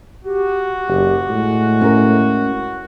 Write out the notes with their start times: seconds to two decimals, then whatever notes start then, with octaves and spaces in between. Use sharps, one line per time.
0.25 F#4 G4
0.87 F#1 G4
1.29 A2 G#3
1.81 C#4 A#4